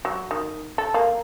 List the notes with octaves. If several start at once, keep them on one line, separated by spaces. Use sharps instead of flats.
F#3
D#3
A4
A#3